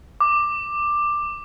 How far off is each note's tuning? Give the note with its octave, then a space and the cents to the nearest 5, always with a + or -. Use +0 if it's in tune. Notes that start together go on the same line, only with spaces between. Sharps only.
D6 +10